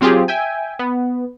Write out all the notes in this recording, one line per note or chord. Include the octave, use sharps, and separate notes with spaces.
F#3 C4 F4 G4 G#4
E5 G5 G#5
B3